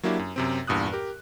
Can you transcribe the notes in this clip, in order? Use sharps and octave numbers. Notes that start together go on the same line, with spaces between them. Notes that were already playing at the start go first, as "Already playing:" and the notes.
F#3 A#3 D4 E4 G4
F#2
F#2 C3 C4
E2 G2 A#2 D#6 F#6
G4 A#4